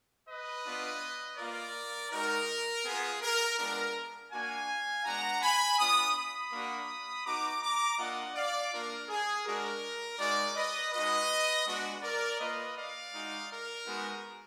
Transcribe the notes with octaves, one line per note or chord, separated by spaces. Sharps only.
B4 D#5
B3 D4 F4
A#3 F4 A#4 D5
G#3 D#4 F#4 A#4
B3 F4 G#4
A#4
G#3 B3 D4 F4 A#4
A#3 D4 F#4 F5 G#5
G#3 B3 D4 F#4 F#5 A#5
G#5 B5
B3 D4 F4 B5 D#6
B5 D#6
A#3 D4 F#4
B3 D#4 F#4 A#5 D6
A#5 D6
A#3 D4 F4 D#5 F#5
D5 F5
A#3 D4 F4 A#4
G#4
G#3 D4 F#4 A#4
G#3 D#4 F#4 A#4 D5
B4 D#5
G#3 D#4 F#4 B4 D#5
G#3 B3 D4 F#4
A#4 D5
A#3 F4 B4 D#5
D5 F5
G#3 D#4 F#4
A#4
G#3 B3 D#4 F#4